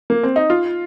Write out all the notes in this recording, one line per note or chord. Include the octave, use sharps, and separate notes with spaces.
A#3
C4
D#4
F4